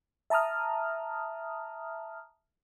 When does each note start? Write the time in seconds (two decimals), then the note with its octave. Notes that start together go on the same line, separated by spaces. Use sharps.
0.30 E5 A5 A#5 D#6 F6